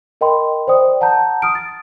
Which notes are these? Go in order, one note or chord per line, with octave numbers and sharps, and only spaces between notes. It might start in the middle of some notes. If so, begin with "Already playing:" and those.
A#4 D#5 G5 B5 C6
C5 D5 G5 D#6
F#5 A5 A#5 G6
D#6 F6 D7
A6